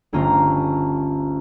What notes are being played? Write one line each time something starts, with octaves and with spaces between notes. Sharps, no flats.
G1 D2 C#4 F4 A#5